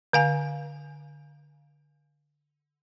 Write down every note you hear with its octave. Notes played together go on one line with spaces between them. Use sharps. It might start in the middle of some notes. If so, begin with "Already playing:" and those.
D3 F5 G#5